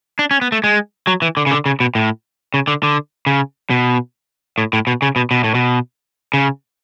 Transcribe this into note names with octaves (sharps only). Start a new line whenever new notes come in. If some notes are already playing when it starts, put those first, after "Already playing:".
D4
C#4
B3
A3
G#3
F#3
E3
D3
C#3
D3
C#3
B2
A2
C#3
D3
D3
C#3
B2
A2
A2
B2
C#3
B2
B2
A2
B2
C#3